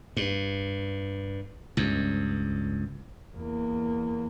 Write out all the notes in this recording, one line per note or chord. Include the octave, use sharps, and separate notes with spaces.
G2
C#2 G2
E2 A#3